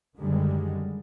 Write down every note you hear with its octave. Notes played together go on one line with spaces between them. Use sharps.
F#2 D3 D#3 G3 G#3